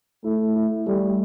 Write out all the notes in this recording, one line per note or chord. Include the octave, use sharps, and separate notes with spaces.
A3 E4
E4
G3 A3